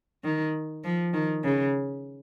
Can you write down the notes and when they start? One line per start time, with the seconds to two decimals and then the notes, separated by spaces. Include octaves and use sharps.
0.24 D#3
0.84 F3
1.13 D#3
1.44 C#3